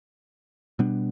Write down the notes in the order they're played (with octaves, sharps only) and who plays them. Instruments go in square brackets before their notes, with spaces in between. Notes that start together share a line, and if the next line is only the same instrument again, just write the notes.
[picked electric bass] B2 G3 B3 D4